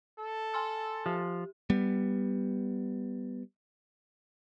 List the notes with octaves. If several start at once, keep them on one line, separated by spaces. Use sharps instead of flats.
A4
G#5 C6 E6
F3 G4
G3 B3